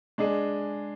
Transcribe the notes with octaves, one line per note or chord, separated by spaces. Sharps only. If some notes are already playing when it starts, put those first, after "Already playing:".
G#3 D4 G#4